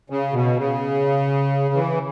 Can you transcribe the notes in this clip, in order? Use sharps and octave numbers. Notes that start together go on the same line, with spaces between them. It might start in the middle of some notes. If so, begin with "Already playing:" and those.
C#3
B2
C#3
E3